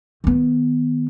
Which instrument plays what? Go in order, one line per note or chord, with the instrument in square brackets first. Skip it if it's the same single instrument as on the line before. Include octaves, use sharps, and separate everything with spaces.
[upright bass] D#3 B3